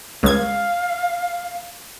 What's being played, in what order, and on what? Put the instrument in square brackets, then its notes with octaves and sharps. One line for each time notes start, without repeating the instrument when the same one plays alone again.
[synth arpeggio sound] C#2 G#6 [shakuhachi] F5